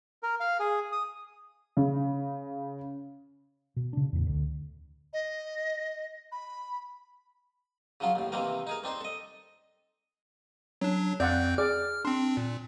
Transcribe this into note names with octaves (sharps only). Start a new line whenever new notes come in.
A#4
F5
G#4
D#6
C#3
B2
C#3 D4
A1 E2
D2
D#5
B5
C#3 F3 F#3 F4
D#2 A2
C3 D#3 E3 A#3 C4 A#4
D#4 G#4 A#4
C4 D4 D#4 C5
A4 D#5
F#3 C#4 D4
F2 C4 D5 F5 F#5 G6
G#4 D5 D6 F6
C4 D4 C6
A#2